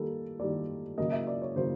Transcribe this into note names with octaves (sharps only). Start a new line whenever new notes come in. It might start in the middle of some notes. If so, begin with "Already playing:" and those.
Already playing: D#3 G3 A#3 A4
D#3 G3 A#3 D5
C#3 F#3 A#3 D#5
E5
D5
C#5
C#3 F#3 A#3 C5